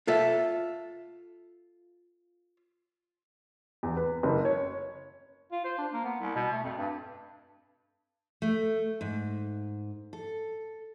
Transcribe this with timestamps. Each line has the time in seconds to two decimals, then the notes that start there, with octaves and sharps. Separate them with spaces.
0.07 F4 A4 E5
3.83 E2
3.97 B4
4.23 F#1
4.45 C#5
5.52 F4
5.65 C5
5.78 D4
5.93 A#3
6.04 B3
6.20 C2
6.35 B2
6.52 A3
6.64 F2
6.77 G2
8.42 A3
9.01 G#2
10.13 A4